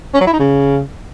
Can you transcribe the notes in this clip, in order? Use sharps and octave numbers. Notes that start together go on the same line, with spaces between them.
C#4
F#3
E4
D#4
C#3